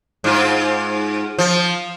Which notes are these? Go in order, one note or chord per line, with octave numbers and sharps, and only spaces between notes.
G#2 F4
F3